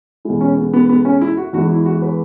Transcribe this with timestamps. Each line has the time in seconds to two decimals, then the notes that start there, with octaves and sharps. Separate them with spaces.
0.25 E2 B2 G#3 E4
0.41 C#4
0.57 B3
0.73 B3
0.89 B3
1.05 C#4
1.21 E4
1.37 F#4
1.53 E2 E3 G#3 F#4
1.69 E4
1.85 F#4
2.02 B4